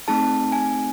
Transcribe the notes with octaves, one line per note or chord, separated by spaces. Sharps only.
A3 C4 D#4 G#4 A5
G#5